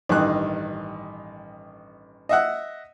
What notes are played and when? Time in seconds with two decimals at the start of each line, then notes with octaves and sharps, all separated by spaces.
0.09 A1 G2 D#3 D#4 F#6
2.29 D#5 E5 F#5